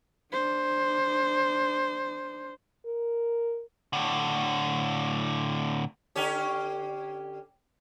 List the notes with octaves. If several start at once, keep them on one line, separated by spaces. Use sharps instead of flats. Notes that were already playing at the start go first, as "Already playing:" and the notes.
D4 C5
A#4
A2 D3
D3 C#4 G4